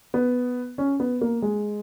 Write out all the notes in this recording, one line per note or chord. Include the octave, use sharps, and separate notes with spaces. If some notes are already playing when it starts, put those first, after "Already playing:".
B3
C#4
B3
A#3
G#3